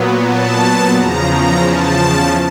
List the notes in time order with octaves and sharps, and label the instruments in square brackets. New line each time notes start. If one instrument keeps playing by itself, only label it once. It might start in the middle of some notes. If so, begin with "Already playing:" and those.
Already playing: [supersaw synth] A#2 F#3 B3
A5
E2 C#3 F3 A#5
A#5
A5